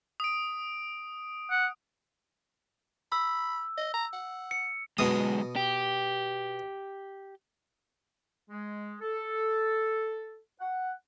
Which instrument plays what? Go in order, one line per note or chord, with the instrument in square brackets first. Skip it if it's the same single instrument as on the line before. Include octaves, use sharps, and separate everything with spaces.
[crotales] D#6 D7
[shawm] F#5
[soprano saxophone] B5 [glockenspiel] E6
[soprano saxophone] D#5
A#5
F#5
[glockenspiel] C#7
[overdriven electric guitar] B1 G#3 [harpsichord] B2 D#6
[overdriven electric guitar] G4
[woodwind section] G#3
A4
F#5